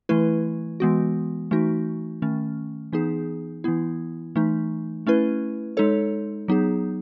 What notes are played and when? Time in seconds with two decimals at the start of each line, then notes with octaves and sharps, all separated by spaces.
0.09 E3 A3 E4 B4
0.80 E3 G#3 B3 F#4
1.51 E3 A3 D#4 F#4
2.22 D#3 A3 C#4
2.93 E3 B3 D#4 G#4
3.64 E3 B3 E4
4.36 E3 A3 D#4
5.07 A3 C#4 E4 B4
5.77 G#3 D#4 A4 C#5
6.48 F#3 B3 D#4 G#4